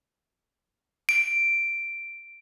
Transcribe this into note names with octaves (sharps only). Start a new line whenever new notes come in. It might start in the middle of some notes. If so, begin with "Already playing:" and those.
D7